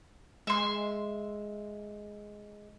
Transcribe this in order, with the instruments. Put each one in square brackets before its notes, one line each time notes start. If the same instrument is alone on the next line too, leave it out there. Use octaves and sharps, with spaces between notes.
[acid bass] G#3 [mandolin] E5 C6